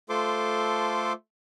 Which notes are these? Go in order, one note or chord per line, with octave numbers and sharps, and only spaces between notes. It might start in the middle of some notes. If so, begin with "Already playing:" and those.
A3 F4 A4 C5 C6 D6